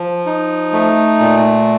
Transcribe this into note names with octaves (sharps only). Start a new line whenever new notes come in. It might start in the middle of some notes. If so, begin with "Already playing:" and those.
Already playing: F3
D#4
A3
A#2